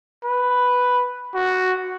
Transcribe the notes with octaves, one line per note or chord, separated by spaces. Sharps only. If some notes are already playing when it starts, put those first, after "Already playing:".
B4
F#4